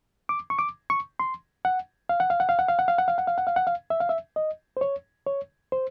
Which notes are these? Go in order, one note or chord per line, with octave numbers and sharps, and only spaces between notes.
D6
C#6
D6
C#6
C6
F#5
F5
F#5
F5
F#5
F5
F#5
F5
F#5
F5
F#5
F5
F#5
F5
F#5
F5
F#5
F5
E5
F5
E5
D#5
C5
C#5
C#5
C5